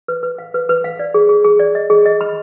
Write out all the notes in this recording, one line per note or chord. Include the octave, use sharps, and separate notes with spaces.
B4
B4
F5
B4
B4
F5
D5
G#4
G#4
G#4
D5
D#5
G#4
D#5
B5